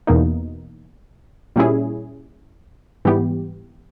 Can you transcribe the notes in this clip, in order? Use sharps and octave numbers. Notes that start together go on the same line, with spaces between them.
E2 B2 A#3 D#4
A#2 G3 C#4 E4 G#4
G#2 E3 G3 B3 G4